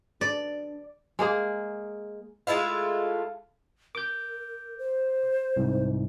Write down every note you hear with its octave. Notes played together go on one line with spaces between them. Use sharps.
D4 D5
G#3 A#3 G#4
G#3 A3 E4 F4
A#4 D6 G6
C5
C2 G#2